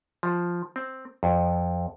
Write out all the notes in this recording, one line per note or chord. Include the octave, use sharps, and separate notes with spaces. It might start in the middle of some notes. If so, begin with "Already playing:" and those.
F3
C4
F2